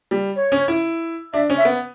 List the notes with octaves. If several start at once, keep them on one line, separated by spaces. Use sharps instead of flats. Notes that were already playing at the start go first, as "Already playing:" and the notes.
G3
C#5
C#4
E4
D4 E5
C#4
E5
B3